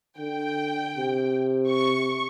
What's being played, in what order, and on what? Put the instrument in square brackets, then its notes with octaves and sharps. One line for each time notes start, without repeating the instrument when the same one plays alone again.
[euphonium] D3 [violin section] G5
[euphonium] C3
[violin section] C#6